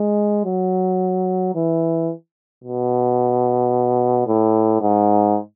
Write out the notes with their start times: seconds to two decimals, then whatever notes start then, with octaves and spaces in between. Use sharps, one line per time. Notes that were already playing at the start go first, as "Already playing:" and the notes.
Already playing: G#3
0.45 F#3
1.55 E3
2.64 B2
4.27 A2
4.81 G#2